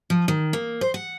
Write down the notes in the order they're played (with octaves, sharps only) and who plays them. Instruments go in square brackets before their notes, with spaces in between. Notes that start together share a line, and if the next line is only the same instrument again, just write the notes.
[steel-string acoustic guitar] F3
D#3
A#3
C5
F#5